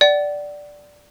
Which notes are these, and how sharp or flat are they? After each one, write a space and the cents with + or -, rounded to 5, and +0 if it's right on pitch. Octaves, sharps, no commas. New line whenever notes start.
D5 +0 F#5 +40